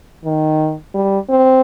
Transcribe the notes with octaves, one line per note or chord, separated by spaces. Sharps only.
D#3
G3
C4